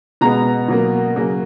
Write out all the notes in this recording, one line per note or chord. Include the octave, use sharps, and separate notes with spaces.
B2 G#3 B3 A#5
B2 F#3 A#3
C#3 F#3 A#3